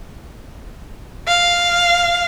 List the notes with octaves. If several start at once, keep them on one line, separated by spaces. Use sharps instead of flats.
F5